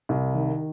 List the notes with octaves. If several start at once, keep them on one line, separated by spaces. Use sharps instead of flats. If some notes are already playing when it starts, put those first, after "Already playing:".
C2
D#3